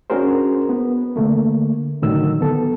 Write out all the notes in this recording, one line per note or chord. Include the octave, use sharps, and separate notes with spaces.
C#4 D4 F#4 G#4 A#4 C5
B3
D3 A3 A#3
A2 D3 D#3 F#3 E6
B3 A4